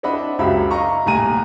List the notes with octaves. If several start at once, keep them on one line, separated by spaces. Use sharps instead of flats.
C4 D4 E4 D#5 F#5 B5
C#2 F#2 F#3 G4 E5 B5
D#5 F5 A#5 C#6
D#1 C2 A2 G#5 A#5 D#7